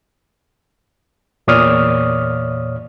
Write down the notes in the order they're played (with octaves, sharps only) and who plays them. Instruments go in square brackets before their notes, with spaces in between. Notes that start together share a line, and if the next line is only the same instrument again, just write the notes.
[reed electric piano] E2 A#2 C#5 D5 D#6 F6